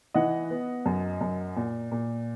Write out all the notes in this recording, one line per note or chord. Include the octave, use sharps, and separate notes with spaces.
E3 D#5 F#5
B3
F#2
F#2
A#2
A#2